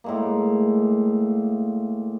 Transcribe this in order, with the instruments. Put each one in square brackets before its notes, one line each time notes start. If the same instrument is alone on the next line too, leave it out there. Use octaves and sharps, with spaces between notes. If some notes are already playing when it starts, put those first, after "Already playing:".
[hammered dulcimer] A2 G#3 A#3